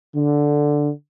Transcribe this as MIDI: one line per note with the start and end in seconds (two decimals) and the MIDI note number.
0.16 0.90 50